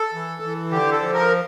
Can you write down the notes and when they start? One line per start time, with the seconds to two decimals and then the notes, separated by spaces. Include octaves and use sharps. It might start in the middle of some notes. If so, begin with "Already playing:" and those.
Already playing: A4
0.14 E3
0.43 E3
0.71 D3 G4
0.92 A4
0.99 F3
1.13 A#4